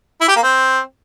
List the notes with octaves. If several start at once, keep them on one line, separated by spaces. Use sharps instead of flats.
E4
G4
A#3
C4